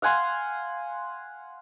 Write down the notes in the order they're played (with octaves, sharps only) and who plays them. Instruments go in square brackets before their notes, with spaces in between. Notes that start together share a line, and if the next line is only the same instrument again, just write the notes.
[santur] F5 F#5 G#5 C6